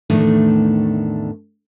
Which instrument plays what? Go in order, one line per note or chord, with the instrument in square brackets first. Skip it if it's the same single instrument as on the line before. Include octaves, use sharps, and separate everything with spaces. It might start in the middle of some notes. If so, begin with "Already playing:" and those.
[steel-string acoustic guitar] E2 A2 D#3 A3 D4